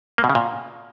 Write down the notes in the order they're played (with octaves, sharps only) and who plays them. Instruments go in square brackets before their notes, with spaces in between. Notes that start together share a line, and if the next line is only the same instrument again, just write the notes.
[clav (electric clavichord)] A#3
B2
C#3
A#2